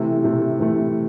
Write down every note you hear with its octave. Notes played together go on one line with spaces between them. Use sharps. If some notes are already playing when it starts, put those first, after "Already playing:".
Already playing: C3 E3 A3
C3 E3 A3
C3 E3 A3